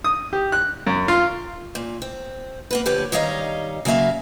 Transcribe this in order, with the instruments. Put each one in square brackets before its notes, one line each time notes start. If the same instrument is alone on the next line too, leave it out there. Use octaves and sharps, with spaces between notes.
[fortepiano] D#6
G4
F#6
F#2
F4
[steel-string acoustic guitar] A#2
C4
A#3 B3 B4
F2 D3 G4 B4 C#5
D#3 G3 C#5 D#5 F5 A#5
C#3 F#3 A#3 E5 F5